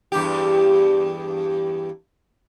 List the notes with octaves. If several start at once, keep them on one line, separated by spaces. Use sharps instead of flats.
E2 G2 G4